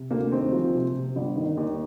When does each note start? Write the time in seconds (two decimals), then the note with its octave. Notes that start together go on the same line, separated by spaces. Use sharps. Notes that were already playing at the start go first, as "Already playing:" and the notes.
Already playing: C3
0.10 D2 A#3
0.32 D#2 C4
0.52 F3
0.74 C3
0.94 C3
1.16 G1
1.36 D#3
1.57 D#2